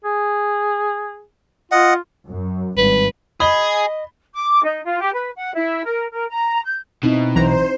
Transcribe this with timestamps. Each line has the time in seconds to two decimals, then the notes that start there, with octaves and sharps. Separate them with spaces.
0.05 G#4
1.72 F4 D#5 F#5
2.28 F#2
2.78 G#1 G2 B4
3.40 G#4 D#5 B5 G7
4.35 D6
4.63 D#4
4.85 F4
4.99 G4
5.13 B4
5.36 F#5
5.54 E4
5.85 A#4
6.13 A#4
6.29 A#5
6.65 G6
7.03 B2 C4 D#4 E4
7.36 B1 E3 C5 A#5